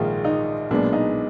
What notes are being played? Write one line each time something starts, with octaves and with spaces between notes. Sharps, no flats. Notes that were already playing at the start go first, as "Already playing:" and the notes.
Already playing: A#1 G#2 D#3 G#3 F4
D#4
B1 A#2 G#3 B3 D4
D#4